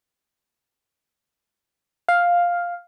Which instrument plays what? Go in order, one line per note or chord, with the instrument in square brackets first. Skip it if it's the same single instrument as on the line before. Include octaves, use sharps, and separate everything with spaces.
[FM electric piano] F5